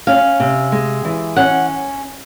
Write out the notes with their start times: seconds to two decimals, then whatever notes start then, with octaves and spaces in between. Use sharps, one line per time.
0.07 C#4 F5
0.40 C3
0.72 G#3
1.05 E3
1.36 C#4 F#5